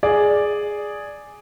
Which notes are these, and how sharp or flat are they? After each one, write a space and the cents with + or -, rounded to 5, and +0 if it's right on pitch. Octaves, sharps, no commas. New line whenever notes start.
G#4 +0 D5 +0